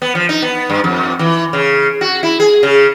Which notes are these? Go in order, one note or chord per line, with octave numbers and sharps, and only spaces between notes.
B3
F3
D#4
B3
G2
F2
E3
C#3
F#4
E4
G#4
C#3